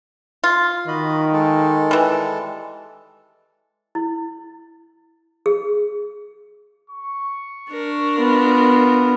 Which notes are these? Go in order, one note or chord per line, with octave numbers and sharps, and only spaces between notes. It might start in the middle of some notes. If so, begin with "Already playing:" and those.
F4
D#3 F#4 D#5 B5
G#3 A4
E3 G3
E4
G#4
C#6
D4 A#4
B3 F4